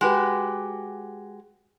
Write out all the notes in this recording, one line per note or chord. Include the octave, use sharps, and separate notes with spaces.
G#3 F#4 G4 B4